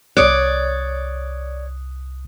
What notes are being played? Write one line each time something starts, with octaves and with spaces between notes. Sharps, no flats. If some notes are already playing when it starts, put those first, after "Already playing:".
C2 C#5 D5 D#6 F#6